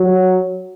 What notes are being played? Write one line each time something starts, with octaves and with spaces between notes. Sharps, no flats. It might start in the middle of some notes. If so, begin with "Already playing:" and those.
Already playing: F#3